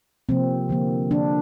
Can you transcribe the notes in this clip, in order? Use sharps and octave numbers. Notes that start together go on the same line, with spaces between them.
C3 F3 A#3 C4
D3 F3 A#3
D3 F3 A#3 D4